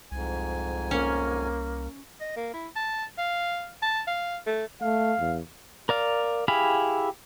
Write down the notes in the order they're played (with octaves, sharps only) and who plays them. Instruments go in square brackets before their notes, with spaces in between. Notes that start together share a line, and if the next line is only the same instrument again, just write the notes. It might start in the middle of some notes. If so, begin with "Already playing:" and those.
[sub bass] C2 [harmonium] F2 G#2 G#5
[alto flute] A#3 [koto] C#4 C#5
[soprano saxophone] D#5
A#3
E4
A5
F5
A5
F5
A3
[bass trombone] A3 [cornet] F5
[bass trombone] E2
[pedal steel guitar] A#4 D5 F5
E4 G4 G#4 F5 B5